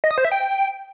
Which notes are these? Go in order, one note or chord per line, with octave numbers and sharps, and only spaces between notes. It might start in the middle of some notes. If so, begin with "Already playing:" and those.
D#5
D#6
C5
E5
G5